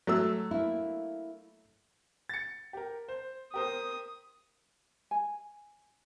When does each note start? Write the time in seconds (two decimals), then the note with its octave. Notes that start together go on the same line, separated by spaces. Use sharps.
0.07 F#3 A3 E6
0.51 A#3 E4
2.29 A6 C#7
2.73 G4 A#4
3.09 C5
3.54 G4 A#4 C5 D#6
5.11 G#5